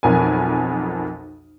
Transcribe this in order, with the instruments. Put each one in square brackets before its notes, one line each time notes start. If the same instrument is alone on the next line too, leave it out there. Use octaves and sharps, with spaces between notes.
[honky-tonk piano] B1 F2 A#4 G#5